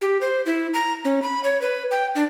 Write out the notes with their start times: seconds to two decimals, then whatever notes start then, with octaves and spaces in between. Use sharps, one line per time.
0.01 G4
0.21 C5
0.46 E4
0.74 A#5
1.05 C#4
1.22 B5
1.44 C#5
1.61 B4
1.91 G5
2.15 D4